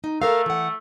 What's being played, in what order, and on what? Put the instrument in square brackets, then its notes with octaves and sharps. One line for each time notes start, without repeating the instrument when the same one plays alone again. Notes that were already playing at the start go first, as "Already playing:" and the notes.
[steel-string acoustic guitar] D#4
[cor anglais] A3 [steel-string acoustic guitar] A4 A#4 F5
[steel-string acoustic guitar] E3 F#5